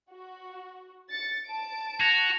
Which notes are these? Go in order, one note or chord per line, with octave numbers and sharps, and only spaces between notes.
F#4
A6 C#7
A5 D7
F#4 G#6 A#6 F7